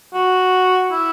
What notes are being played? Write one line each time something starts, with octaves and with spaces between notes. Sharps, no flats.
F#4
E4